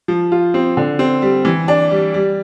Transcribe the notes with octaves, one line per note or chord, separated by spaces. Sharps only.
F3
F4
C4
D3
C4
G3
E3
D4
G3
G3